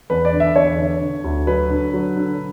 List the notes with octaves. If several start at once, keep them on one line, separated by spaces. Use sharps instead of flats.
E2 B4
D5
D3
E5
E2 C#5
D3
D3
D2
F#3 B4
D3
F#3
D3